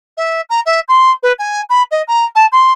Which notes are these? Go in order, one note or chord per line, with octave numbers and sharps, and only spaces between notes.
E5
A#5
E5
C6
B4
G#5
B5
D#5
A#5
A5
C6